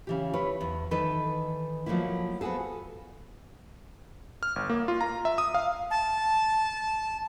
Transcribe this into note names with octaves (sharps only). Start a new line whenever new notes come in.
C#3 E3 G4
E4 B4 C#5
E2
D#3 E3 D#4 A4 B4
F3 F#3 A3 A#3 E4
B3 C4 F#4 G#4 A4
F6
G1
A#3
F4
A#5
E5
D#6
F5
A5